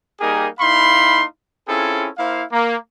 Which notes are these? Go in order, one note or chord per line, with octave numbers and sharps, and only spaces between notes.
G3 A#3 D#4 G4 G#4 A#4
A#3 D#4 E4 F5 B5 C6
C4 C#4 E4 F4 G#4 A4
A#3 E4 C5 F5
A#3